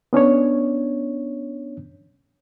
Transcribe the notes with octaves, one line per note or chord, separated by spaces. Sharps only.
B3 C#4 D4 C#5